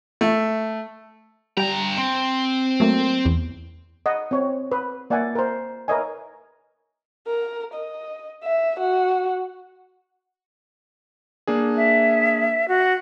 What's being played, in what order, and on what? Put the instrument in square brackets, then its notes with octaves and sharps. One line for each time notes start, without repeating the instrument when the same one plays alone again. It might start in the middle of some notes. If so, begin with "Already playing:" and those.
[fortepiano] A3
[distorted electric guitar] G2 A#5 [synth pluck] G3 G5
[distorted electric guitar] C4 [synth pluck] C#7
[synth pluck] F#3 A3 A#3
E2
[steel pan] D#5 F#5
C4 C#5
B4
A#3 D5 E5 F#5 G#5
A#4 C5
A#4 B4 C#5 D#5 E5 G#5
[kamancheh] A#4
D#5
E5
F#4
[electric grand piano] A#3 D4 G#4
[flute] E5
F#4